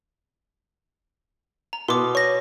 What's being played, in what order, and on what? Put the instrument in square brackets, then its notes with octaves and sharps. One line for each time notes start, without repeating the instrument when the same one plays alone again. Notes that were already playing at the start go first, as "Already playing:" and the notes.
[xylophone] A#5
[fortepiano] B2 [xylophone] C6 D6
[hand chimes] C#5 [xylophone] C#6 A#6